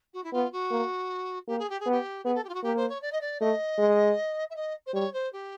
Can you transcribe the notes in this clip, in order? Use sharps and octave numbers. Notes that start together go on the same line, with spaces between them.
F#4
E4
B3 F4
F#4
A#3
A#3 G4
G#4
G4
G#4
B3 G4
B3 G#4
A4
G4
F4
F#4
A#3 G4
C5
C#5
D5
D#5
D5
A3 D#5
G#3
E5
D#5
C5
G3 C#5
C5
G4